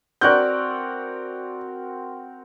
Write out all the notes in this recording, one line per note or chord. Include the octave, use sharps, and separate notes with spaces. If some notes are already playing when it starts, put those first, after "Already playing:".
C4 F#4 A#4 D5 F#6 G6